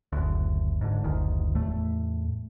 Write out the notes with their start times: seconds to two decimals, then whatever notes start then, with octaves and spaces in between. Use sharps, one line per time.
0.12 F#1 D2
0.81 G#2 D3
1.04 F#1 D2 D#3
1.55 E2 A2 A3